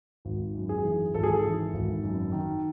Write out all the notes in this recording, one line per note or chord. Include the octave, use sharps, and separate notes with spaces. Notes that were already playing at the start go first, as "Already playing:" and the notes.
G#1
F#2
G#4
E3
G#1 A4
G#4
A4
E3
G#1
F#2
D#3